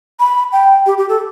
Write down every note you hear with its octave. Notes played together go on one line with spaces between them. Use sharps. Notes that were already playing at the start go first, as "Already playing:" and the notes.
B5
G5
G4
G4
A4